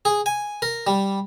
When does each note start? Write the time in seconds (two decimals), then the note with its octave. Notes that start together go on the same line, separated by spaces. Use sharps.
0.05 G#4
0.26 G#5
0.62 A#4
0.87 G3